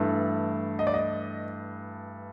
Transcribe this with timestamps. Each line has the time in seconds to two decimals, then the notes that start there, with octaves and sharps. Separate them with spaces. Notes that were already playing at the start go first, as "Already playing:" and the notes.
Already playing: G2 E3 A3
0.79 D#5
0.87 D5
0.94 D#5